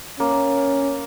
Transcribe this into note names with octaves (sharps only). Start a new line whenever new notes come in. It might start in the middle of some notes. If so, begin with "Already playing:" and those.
A#3 C#4